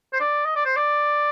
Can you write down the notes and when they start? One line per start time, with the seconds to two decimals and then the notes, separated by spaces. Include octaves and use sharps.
0.13 C5
0.21 D5
0.45 D#5
0.56 D5
0.65 C5
0.76 D5